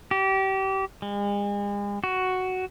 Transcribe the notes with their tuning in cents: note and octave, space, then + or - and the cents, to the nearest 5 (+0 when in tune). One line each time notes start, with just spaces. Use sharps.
G4 -30
G#3 -40
F#4 +5